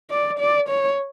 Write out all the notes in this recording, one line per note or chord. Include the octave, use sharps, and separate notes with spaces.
D5
D5
C#5